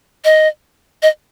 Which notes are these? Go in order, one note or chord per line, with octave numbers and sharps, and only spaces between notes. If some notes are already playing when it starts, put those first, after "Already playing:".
D#5
D#5